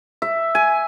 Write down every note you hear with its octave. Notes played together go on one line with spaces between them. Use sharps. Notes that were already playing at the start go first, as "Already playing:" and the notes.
E5
G#5